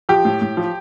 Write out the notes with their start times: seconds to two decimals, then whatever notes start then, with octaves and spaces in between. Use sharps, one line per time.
0.09 F3 G4
0.25 A2
0.42 A2
0.57 F3